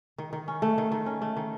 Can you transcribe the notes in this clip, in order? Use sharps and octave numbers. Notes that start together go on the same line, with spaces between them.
D#3
D#3
C#4
A3
D#3
D#3
C#4
A3
D#3